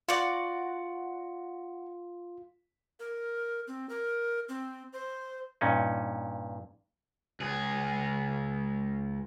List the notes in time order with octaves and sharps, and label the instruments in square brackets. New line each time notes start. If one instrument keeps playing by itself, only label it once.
[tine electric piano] F4 [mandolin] F#4 D5
[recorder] A#4
C4
A#4
C4
C5
[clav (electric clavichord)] G2 A#2 C#4 D#4
[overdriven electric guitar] C#2 G#4